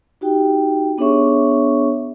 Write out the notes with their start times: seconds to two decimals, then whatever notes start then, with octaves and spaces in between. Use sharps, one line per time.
0.21 D#4 F#4 G4 G5
0.98 B3 D4 G#4 C#5 E5 C#6